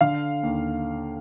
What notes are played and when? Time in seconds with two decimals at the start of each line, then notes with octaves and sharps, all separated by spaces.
0.01 D3 F5
0.43 D#2